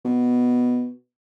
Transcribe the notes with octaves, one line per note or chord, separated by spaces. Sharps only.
B2